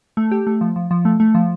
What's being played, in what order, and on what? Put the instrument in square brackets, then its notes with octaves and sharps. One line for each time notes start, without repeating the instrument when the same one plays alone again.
[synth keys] A3
G4
A3
F3
F3
F3
A3
A3
F3